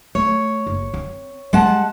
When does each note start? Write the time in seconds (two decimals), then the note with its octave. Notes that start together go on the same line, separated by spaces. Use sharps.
0.15 A3 C#5
0.67 F#1
0.94 C4
1.53 G3 G#3 F#5 A5